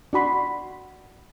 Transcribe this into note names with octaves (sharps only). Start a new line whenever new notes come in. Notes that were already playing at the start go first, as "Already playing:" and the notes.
D4 F#4 B5 C6